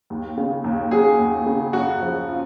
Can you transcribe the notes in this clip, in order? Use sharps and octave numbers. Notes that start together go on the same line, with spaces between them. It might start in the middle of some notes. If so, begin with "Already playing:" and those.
D#2
C#3
D#2
F#3 G#4
D#2
C#3
F#2 F#4
F3
F4